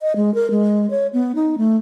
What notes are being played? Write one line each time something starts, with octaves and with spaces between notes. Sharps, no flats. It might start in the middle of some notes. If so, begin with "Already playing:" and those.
D#5
G#3
A#4
G#3
C#5
B3
D#4
A3